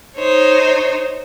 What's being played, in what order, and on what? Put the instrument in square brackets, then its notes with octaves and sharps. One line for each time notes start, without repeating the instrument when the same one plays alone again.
[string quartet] D#4 C5 C#5